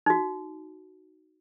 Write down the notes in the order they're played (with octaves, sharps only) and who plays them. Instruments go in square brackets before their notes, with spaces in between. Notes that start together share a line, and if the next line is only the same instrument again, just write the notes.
[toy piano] D#4 F#4